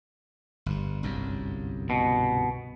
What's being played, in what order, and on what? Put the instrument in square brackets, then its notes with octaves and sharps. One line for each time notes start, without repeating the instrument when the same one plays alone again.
[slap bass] G1 G2
G1 C2 F#2
[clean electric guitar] B2